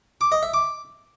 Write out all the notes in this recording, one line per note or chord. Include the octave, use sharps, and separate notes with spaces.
D6
D#5
E5
D6